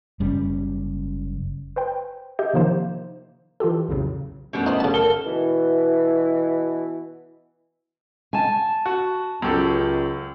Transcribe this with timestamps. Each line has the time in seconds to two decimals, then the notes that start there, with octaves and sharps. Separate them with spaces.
0.20 F#1 G3 C#4
1.76 B4 C5 G5
2.39 G4 D#5 E5 G6
2.53 C3 D#3 F3 A#3 D#4 C5
3.60 E3 F4 G4 A4
3.88 B1 E2 A2 C#3 F#3
4.53 F#2 B2 G3 A3 B3
4.66 D#4 C5
4.80 C#3 A5
4.94 A4 A#4
5.25 B2 E3
8.33 G#5 A5
8.86 F#4
9.42 C#2 F#2 G4 A4